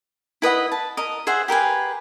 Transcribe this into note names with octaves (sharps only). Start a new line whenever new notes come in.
E4 B4 D#5 F#5
A5
A#4 D#5
G#4 C5 E5 F#5
G4 A#4 B4 G#5